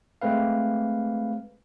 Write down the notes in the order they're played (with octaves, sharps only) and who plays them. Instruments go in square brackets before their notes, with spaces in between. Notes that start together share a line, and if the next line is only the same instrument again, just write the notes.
[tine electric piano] G#3 A3 C4 B4 F5